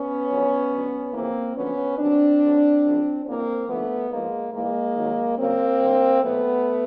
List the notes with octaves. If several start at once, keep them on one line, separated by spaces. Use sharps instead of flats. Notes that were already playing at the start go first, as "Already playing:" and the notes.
Already playing: B3 C#4
F2 D3 F#3
D2 D3 F#3
F2 C#3 E3 A#3 C4
F#2 D3 F3 B3 C#4
D#2 D3 F#3 C4 D4
D2 D3 F#3
F#2 C#3 F3
E2 C#3 E3 A#3 C4
D#2 D3 F3 A3 B3
G#2 F3 G#3 A#3
G#2 E3 G#3 A#3
D#2 D#3 F#3
F#2 C#3 F#3 A#3 C4
D2 D3 F#3
E2 B2 F#3 A3 B3